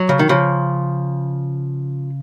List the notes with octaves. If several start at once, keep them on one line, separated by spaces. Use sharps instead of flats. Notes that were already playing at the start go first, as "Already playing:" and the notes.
Already playing: F#3
C#3
D#3
C#3 F3